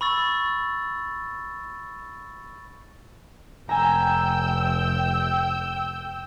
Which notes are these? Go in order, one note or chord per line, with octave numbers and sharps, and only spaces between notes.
B5 C#6 E6 A6
F1 G5 G#5 A#5 E6 G6